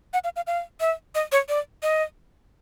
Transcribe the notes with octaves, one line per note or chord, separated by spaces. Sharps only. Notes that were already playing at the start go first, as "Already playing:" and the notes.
F#5
F5
F5
F5
E5
D#5
C#5
D5
D#5